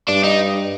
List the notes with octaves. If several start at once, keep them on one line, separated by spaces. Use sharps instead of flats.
G2 D4
D#4